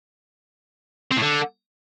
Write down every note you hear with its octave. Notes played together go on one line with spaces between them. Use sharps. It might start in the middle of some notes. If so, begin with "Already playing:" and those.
C4
A2
D3